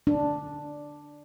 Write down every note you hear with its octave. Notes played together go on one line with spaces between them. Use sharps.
D4